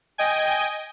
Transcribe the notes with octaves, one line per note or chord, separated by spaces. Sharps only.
D#5 G5 G#5